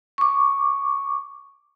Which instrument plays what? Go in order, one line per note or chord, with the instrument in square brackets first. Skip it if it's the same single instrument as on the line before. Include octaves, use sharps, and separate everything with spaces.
[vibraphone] C#6 D6